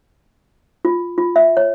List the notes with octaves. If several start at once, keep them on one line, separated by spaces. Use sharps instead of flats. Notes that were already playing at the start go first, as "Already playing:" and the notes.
F4
F4
E5
C#5